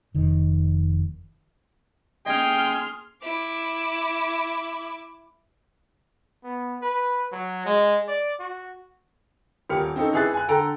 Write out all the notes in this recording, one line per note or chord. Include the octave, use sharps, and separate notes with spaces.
F1 D#3
A#3 C#4 G#4 D#5 G5 C6 F6
E4 D6
B3
B4
F#3
G#3
D5
F#4
D#1 A#3 G4 F6 C#7
C4 C#4 D#4 A4
E3 E4 G#4 F#6 A6
G#5 F#6
D3 A4 G5 A#5 D7